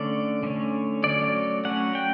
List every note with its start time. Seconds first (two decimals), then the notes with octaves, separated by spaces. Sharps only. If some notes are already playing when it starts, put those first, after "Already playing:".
Already playing: D3 A3 C#4 D5
0.43 D3 A3 C#4
1.04 F#3 A3 C#4 D5
1.65 F#3 A3 C#4 F#5
1.95 G5